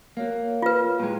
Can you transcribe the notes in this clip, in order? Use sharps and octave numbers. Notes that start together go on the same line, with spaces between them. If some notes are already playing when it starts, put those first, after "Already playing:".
A#3 F#4 C#5 F5
F4 B4
A#2 G3 G#3 E4